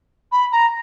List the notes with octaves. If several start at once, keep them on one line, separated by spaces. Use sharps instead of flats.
B5
A#5